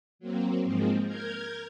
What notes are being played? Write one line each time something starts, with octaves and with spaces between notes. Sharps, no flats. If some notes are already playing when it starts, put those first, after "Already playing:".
F#3 A#3 C4
G#2 F3 G#3 A#3 C4
A#4 F6 G6 G#6